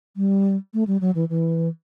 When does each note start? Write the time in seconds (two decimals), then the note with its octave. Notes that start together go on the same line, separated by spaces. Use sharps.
0.17 G3
0.74 A3
0.87 G3
1.01 F#3
1.15 E3
1.29 E3